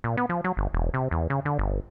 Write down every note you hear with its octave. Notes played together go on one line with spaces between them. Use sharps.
A#2
B3
F3
F#3
G1
E1
C3
E2
C#3
D3
G1